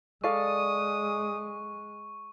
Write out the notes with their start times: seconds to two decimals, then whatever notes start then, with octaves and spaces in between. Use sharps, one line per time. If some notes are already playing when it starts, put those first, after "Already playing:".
0.24 G#3 A4 D5 F5 C#6 D#6